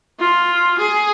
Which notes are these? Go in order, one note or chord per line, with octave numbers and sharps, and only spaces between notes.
F4
G#4